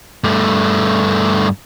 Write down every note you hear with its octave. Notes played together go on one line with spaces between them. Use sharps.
G2 A3